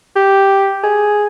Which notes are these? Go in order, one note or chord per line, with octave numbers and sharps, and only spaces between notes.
G4
G#4